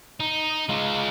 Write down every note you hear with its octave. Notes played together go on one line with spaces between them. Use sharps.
D#4
G#3 F4